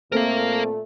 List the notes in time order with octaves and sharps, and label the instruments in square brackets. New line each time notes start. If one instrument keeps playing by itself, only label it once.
[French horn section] A#2 A3 [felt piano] A#3 C4 A4 [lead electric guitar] A#4 F5